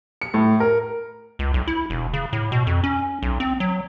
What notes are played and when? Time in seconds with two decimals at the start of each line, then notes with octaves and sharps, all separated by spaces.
0.22 C#7
0.34 A2
0.60 A#4
1.39 C#2
1.54 B1
1.67 E4
1.90 E1
2.14 C#3
2.33 A2
2.52 B2
2.67 F2
2.84 C#4
3.22 B1
3.40 C4
3.60 F#3